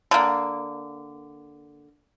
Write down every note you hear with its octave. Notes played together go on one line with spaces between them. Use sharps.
D3 A#3